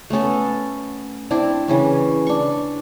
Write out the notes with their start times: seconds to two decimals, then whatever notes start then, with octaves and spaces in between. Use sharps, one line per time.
0.10 A3 B3 C#4 A4
1.31 C4 D4 E4
1.68 C#3 E3 C#4
2.27 D4 C#6